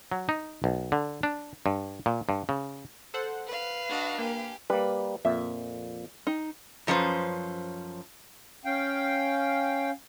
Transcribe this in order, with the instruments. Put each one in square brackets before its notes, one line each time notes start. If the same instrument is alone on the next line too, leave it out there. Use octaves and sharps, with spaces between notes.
[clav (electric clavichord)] F#3
D#4
B1
D3
D4
G2
A#2
G2
C#3
[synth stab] A4 C5 F#5
[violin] B4 F5
[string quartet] D4 F#4 D#5
[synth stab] A#3 [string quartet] G4 G#5
[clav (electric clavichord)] G3 A#3 [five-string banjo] B4
[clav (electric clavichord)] F2 A#2 [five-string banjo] E5
[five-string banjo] D#4
[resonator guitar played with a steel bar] F#2 F3 C#4 B4 C5
[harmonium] C#4 F5 G5